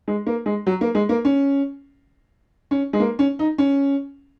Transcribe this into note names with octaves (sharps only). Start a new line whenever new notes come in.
G#3
A#3
G#3
F#3
A#3
G#3
A#3
C#4
C#4
G#3
A#3
C#4
D#4
C#4